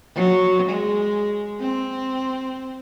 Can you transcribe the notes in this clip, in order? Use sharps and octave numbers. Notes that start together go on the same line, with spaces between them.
F#3
G#3
C4